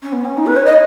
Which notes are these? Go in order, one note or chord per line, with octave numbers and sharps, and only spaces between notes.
C#4
B3
C#4
D#4
B4
C#5
D#5